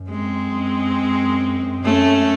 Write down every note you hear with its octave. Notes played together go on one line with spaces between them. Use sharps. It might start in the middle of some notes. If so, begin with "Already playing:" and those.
Already playing: F#2
G#3 C4
F#2
F#2
F#2 A3 C#4